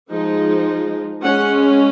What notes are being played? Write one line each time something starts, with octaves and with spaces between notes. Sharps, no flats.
F3 G#3 D#4
G#3 C#4 F#5